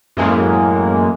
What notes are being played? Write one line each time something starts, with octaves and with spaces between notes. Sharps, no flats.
F#2 A2 E3 G#3 A#3